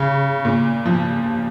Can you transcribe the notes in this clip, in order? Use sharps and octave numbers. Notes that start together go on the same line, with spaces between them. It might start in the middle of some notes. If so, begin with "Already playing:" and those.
Already playing: C#3
A#2
F3